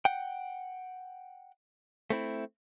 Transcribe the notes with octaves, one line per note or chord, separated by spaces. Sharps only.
F#5 G5
A3 C4 E4